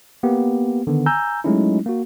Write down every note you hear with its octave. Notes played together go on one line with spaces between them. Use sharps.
A#3 B3 G4
D3 D#3 B3
G#5 A#5 E6 G6
F#3 G#3 A3 C#4 D#4 E4
A#3 F#4